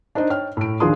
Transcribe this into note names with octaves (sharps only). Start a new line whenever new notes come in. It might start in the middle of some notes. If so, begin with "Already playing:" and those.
D4 D#4 C5 D#5
C#5 G5 F6
A2 D7
D#2 F3 D4 G#4 C6 D#6